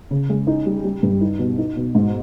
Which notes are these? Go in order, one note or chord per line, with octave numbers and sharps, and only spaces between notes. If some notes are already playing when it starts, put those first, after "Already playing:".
C#3
G#3
D#4
G3
G3
G2
D#4
B2
D#4
B2
G#2